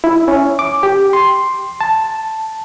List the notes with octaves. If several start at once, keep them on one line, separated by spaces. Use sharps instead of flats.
E4
C#4
D6
G4
C6
A5